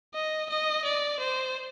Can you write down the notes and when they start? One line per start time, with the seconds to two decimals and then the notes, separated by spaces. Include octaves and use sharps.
0.14 D#5
0.50 D#5
0.84 D5
1.19 C5